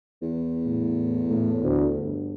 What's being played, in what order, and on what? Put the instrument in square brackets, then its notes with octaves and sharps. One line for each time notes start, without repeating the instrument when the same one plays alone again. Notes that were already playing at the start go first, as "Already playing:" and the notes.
[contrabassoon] E2
[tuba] A2
A2
D2
G1